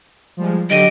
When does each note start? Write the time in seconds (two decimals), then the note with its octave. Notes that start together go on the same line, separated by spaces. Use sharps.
0.37 F3 G3 G#3
0.70 D3 F#3 G4 D#5 D7 D#7